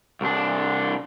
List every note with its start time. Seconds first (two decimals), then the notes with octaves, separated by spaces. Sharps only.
0.21 C2 D4